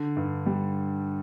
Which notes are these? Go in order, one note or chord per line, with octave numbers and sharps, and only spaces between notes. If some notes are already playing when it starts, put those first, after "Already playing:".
Already playing: D3
G2
G3